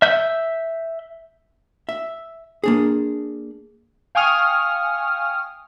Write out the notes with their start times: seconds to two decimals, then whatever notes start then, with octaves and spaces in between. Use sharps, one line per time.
0.02 E5 G6
1.89 E5
2.64 A#3 D4 G#4
4.15 F5 G5 G#5 C#6 D#6 F6